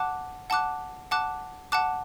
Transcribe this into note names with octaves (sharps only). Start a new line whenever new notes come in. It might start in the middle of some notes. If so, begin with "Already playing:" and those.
Already playing: F#5 A5 D6 F#6
F#5 A5 D6 F#6
F#5 A5 D6 F#6
F#5 A5 D6 F#6